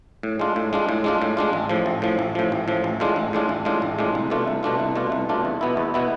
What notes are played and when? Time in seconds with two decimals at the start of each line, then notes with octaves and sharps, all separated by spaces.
0.23 A2
0.39 G#3 D4 F4
0.56 A2
0.73 G#3 D4 F4
0.89 A2
1.04 G#3 D4 F4
1.22 A2
1.37 G#3 D4 F4
1.53 A1
1.69 A2 F3
1.86 A1
2.02 A2 F3
2.19 A1
2.35 A2 F3
2.52 A1
2.68 A2 F3
2.84 A1
3.00 A2 G#3 D4 F4
3.16 A1
3.33 A2 G#3 D4 F4
3.49 A1
3.65 A2 G#3 D4 F4
3.82 A1
3.98 A2 G#3 D4 F4
4.15 C2
4.30 B2 A3 D4 F4
4.47 C2
4.63 B2 A3 D4 F4
4.80 C2
4.95 B2 A3 D4 F4
5.12 C2
5.29 B2 A3 D4 F4
5.45 E2
5.61 B2 B3 E4
5.77 E2
5.94 B2 B3 E4